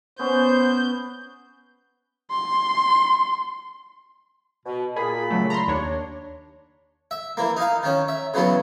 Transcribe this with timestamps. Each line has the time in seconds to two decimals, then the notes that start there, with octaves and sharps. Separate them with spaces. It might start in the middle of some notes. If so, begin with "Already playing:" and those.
0.19 B3 C#4 C5 G6
2.31 C6
4.66 B2
4.96 A#2 G#4 B5
5.31 C#3 F#3 A3
5.50 A#5 C6
5.67 D#2 D4 C#5
7.11 E5
7.37 E3 A#3
7.57 D#4 F5
7.83 D#3 C#4
8.08 E5
8.34 C#3 E3 F#3 B3